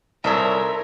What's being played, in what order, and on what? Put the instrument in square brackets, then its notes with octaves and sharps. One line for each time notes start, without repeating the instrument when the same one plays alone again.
[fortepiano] C2 [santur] D#4 A4 C#5 [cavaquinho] E4 C5 E5 [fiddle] A#4